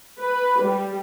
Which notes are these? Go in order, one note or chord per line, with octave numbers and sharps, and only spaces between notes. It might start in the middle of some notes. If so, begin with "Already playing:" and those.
B4
G3